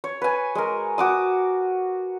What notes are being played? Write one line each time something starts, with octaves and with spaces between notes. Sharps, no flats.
C#5
B4 G#5
G#3 A#4
F#4 D6 D#6